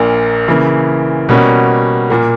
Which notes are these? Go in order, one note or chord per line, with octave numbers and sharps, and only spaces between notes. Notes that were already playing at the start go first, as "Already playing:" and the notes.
Already playing: A#1 A#2 A#3
C#3 E3 A#3
B2 G3 A#3 C#4 F#4
A#2 A#3